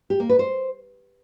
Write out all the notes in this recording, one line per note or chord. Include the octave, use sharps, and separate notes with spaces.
G4
A#3
B4
C5